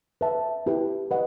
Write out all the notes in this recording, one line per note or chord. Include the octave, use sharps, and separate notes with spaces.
B4 E5 A5
E4 G4 B4
B4 D#5 F#5